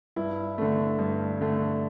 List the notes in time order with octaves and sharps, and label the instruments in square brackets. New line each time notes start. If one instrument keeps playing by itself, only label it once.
[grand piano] G2 E4
D3 A3
G2
D3 A3